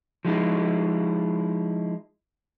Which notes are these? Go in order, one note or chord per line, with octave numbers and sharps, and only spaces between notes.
F3 G#3 D#4 E4